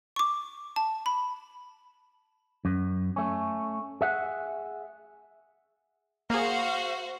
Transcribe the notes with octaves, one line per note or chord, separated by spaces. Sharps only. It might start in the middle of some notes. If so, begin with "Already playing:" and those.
C#6 D6
A5
B5
F#2
A3 C#4
G#4 E5 F#5
A#3 F#4 G#4 C5 F5